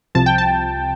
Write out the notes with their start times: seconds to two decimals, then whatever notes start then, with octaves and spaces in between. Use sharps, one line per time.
0.15 C2 C3 F3 A5
0.26 G5
0.38 A5